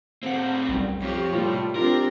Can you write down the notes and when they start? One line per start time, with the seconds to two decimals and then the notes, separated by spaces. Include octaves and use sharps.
0.23 A2 C4 F5 F#5
0.69 B1 F#2 G3
1.02 F2 F4 G4 C#5
1.32 A2 C3 G3 A#3 F4
1.76 C4 D4 F4 G4 A#4